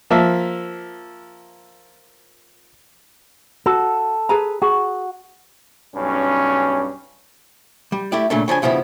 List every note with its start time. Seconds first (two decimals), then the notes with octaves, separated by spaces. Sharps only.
0.10 F3 A#3 E5
3.66 F#4 A4
4.29 G#4 B4 A#5
4.62 F#4 G#4
5.95 B1 G2 C#4
7.92 G3
8.12 A3 E4 G4 D5
8.30 A#2 C#3 A3 D4
8.48 C#3 F3 D4 G#5
8.62 G2 C#3 F3 B3 E4